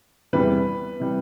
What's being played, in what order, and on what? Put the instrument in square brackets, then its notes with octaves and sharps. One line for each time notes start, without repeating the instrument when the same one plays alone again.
[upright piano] E2 C3 E3 G3 B4
C3 E3 G3